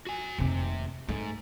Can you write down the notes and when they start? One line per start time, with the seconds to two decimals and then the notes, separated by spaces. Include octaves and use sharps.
0.07 F#4 G#5
0.38 F1 D#2 C3
1.09 G#2 A3